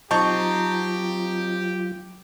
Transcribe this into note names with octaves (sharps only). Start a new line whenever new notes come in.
F#3 C4 D#4 F4 G4 A5 C#6 G6